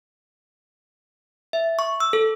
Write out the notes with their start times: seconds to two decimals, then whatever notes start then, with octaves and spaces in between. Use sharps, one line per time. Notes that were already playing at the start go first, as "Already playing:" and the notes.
1.53 E5
1.79 C#6
2.00 E6
2.13 A4